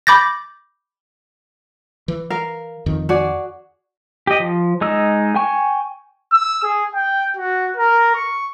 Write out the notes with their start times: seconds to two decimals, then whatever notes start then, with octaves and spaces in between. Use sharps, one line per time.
0.07 B5 D6 G6 A6 A#6
2.08 E3
2.30 A#4 F5
2.86 F2 D#3
3.09 F#4 G#4 D5
4.27 G4 D#5
4.40 F3
4.81 G#3 D#4 E6
5.36 G5 G#5 C#6
6.33 E6
6.63 G#4
6.95 G5
7.37 F#4
7.77 A#4
8.15 C#6